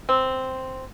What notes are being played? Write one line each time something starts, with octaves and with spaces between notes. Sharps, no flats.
C4